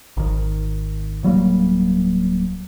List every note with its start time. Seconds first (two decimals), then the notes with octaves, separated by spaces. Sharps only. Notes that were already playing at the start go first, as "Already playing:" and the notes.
0.17 G#1 D#3
1.23 D1 F#3 G3 A#3